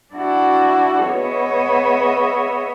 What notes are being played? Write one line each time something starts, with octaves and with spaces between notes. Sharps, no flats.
D4 E4 F#4
B3 G#4 C#5 D#5 E5